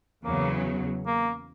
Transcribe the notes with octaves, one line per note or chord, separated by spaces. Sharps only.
E2 C#3 F#3 A#3
A#3